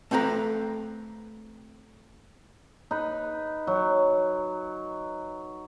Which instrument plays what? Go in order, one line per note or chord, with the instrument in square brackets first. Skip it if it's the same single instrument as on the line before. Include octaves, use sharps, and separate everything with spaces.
[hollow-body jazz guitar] A3 C4 A4 B4 A#5
[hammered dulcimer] D#4 B4
F#3